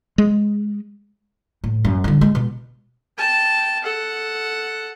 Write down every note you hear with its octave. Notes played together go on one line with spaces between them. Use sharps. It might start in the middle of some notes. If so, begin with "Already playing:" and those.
G#3
A2
F#2
G2 D3
G#3
B2
G5 A5
A4 F#5